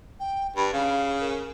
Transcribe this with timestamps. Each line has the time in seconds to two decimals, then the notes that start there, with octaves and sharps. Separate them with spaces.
0.20 G5
0.56 G2 B5
0.73 C#3 F5
1.21 A#4